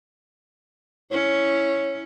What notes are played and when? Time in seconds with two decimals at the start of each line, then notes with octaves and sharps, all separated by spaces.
1.12 C#4 E4 C#5